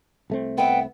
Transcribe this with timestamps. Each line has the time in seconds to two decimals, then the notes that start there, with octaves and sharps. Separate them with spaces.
0.30 C2 A3 C4
0.58 B3 E5 G5